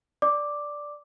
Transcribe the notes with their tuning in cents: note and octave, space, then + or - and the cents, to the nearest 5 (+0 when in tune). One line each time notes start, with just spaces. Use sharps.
D5 +0 D6 +0